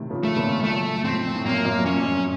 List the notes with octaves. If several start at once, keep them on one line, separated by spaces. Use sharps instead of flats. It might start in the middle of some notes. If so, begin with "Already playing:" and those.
Already playing: A2 C3 D#3
C#3 F3
A3
A#2 C#3
F#2 A#2 A3
F2 A2 C4
A2
F#2 A#2 A#3
F#2 A#2
F2 A2 C#4
F#2